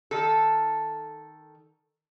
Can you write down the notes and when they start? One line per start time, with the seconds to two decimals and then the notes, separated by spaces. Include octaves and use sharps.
0.11 D#3 A4